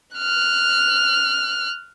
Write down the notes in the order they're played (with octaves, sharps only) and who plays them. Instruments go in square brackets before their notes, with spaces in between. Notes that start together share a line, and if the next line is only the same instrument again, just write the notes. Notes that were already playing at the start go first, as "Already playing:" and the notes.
[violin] F6 F#6